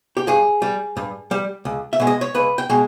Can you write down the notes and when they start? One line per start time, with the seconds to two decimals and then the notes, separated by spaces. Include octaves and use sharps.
0.17 G4
0.27 G2 G#4
0.62 G3
0.97 G2
1.31 G3
1.65 C#2
1.93 E5
2.00 B2 G#3
2.07 D#5
2.21 C#5
2.34 C#2 B4
2.58 G5
2.69 B2 G#3